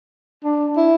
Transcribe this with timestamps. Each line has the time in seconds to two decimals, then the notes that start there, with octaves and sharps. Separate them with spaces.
0.44 D4
0.77 E4